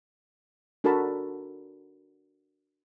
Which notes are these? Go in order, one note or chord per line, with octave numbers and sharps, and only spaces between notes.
D4 F#4 A4 A#4 A5 B5